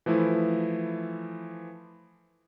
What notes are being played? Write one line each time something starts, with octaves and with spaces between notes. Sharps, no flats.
E3 F3 A3 E4